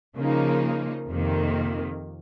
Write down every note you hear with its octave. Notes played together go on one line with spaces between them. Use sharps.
C#3 F3 A#3 D#4
F2 C3 D#3 A#3